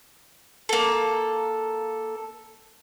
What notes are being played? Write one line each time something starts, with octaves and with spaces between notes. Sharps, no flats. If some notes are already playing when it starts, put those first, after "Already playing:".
A#3 A4